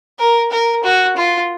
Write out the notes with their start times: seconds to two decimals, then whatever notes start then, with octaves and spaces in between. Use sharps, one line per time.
0.19 A#4
0.52 A#4
0.84 F#4
1.17 F4